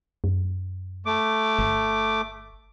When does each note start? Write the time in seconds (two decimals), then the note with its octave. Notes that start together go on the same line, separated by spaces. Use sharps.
0.24 F#2
1.06 A3 D6
1.59 G1